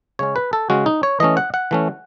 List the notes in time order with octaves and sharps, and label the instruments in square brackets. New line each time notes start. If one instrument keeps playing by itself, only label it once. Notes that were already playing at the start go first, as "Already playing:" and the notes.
[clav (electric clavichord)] C#3 G#3 C#4 C#5
B4
A4
C#3 G#3 C#4 F#4
D#4
C#5
E3 A3 C#4 D#5
F#5
F#5
E3 A3 C#4